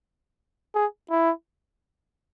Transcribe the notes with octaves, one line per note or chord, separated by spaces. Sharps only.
G#4
E4